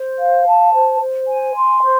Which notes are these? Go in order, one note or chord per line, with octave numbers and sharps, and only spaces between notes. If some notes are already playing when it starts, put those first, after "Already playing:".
Already playing: C5
F5
A5
C5
C5
G#5
C6
C5